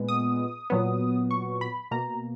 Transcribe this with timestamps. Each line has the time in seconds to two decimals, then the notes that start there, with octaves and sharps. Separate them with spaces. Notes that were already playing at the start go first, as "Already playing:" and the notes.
Already playing: A#2 G#3 B3
0.09 D#6
0.70 A#2 F#3 B3
1.31 C#6
1.61 B5
1.91 B2 A#3 A#5